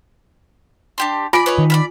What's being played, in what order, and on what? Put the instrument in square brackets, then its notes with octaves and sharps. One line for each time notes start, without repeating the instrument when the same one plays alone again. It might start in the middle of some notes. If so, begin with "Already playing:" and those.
[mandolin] D4 G4 C6
[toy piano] F4 G#5 [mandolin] D5 B5
[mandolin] B4 C#5 D#5
[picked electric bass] D#3
[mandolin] D5 F5 B5